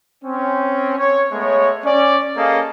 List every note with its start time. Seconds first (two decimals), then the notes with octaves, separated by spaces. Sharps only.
0.24 C4 C#4
0.98 C#5
1.32 G#3 A3 B3 C#5
1.84 C#4 D5
2.37 A#3 C#4 G#4 A4 D#5 F5